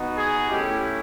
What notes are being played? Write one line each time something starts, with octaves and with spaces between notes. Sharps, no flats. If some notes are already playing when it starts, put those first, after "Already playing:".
Already playing: B3 D#4 F#4
G#4
A3 C#4 E4 G4